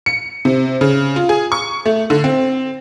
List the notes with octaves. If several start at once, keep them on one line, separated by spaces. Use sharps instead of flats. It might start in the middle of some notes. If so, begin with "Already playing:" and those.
C#7
C3
C#3
F4
G#4
C#6
A3
D3
C4